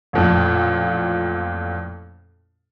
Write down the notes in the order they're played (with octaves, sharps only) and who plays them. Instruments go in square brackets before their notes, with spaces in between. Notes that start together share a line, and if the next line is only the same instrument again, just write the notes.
[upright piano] A1 F2 A#2